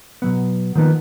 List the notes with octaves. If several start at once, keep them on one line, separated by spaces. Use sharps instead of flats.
B2 F#3 B3
D#3 F3 A#3 B3 D#4